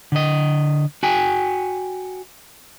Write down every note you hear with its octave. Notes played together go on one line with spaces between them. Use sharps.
D3 D#5
F#4 G5 G#5